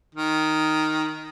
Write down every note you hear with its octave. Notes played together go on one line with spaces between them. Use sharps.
D#3